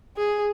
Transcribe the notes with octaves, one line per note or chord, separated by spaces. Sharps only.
G#4